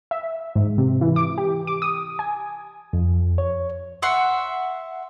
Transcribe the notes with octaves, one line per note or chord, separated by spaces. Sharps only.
E5
G#2
C3
E3
D6
G4
D6
D#6
G#5
F2
C#5
E5 F#5 C6 C#6